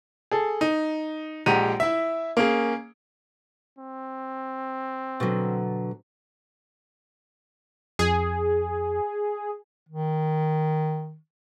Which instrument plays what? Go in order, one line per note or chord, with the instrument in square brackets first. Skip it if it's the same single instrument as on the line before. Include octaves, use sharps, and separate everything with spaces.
[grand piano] G#4 A4
D#4
A#1 G#3 G4 F#5 A#5 D#7
E4 E5
A#3 C#4 G#4
[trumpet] C4
[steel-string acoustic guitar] B2 D3 F#3
[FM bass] F2 [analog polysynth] G#4
[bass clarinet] D#3